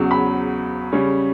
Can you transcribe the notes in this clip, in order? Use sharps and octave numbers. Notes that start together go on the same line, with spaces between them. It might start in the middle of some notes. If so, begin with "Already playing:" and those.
Already playing: E2 C#3 F#3
B5
C#3 G3 C#4